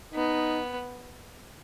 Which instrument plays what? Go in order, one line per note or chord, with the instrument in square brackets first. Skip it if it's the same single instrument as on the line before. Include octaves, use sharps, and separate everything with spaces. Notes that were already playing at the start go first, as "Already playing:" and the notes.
[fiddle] B3 [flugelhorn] D#4